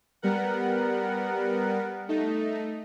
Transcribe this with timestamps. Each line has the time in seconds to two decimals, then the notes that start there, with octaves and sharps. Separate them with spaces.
0.22 G3 B3 A#4 F#5
2.09 A3 D#4